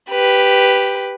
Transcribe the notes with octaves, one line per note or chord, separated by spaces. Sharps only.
G4 B4